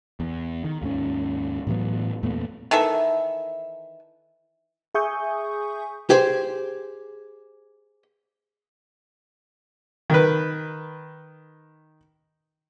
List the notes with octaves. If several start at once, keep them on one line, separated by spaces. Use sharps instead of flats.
E2
D#3
D#2 G#2 C#4
A2 E3 F#3 B3
E2 A#2 A3 B3
D#3 E3 A4 E5
G#4 E5 G#5 C#6 D#6 G6
G4 G#4 C5
D#3 B4